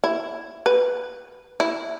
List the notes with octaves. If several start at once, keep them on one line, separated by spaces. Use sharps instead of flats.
E4
B4
E4